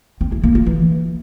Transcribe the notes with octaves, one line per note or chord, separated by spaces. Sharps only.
C4
E4
A#3
F4
E3